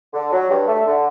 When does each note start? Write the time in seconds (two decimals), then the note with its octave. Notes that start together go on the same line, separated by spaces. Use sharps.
0.14 D3
0.32 F#3
0.50 G2
0.68 A3
0.86 D3